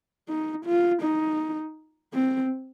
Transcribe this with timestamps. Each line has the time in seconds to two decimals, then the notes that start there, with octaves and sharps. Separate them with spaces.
0.29 D#4
0.66 F4
1.03 D#4
2.14 C4